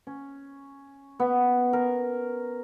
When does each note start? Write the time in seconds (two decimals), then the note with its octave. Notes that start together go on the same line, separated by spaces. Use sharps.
0.07 C#4
1.20 B3
1.73 A#4